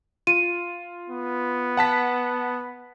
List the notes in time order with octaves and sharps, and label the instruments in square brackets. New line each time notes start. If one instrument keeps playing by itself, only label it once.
[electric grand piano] F4 [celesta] D#7
[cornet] B3
[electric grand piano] F#5 A5 B6